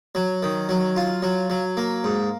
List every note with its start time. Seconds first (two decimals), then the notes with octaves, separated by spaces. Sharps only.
0.15 F#3
0.43 D#3
0.69 F#3
0.96 F4
1.22 F#3
1.50 F#3
1.77 A#3
2.04 G#2